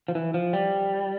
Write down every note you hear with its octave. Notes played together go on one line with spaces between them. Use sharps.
F3
E3
F3
G3